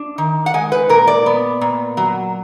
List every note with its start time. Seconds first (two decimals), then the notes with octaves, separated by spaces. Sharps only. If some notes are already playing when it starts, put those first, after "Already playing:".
Already playing: D4
0.18 D#3
0.46 F#5
0.54 G#3 G#5
0.72 B4
0.89 A#2 A#4
1.07 D5
1.26 B3
1.61 A#2
1.97 F#3